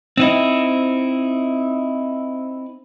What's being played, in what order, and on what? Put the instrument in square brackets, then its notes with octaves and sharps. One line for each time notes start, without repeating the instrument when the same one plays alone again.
[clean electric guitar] C4 D#4 E4